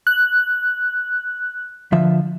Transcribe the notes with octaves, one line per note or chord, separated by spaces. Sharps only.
F#6
D3 F3 E5